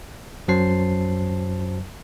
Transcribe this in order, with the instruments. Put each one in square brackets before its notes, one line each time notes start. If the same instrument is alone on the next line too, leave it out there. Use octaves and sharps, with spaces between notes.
[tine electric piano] F#2 F#3 C5 A5 C7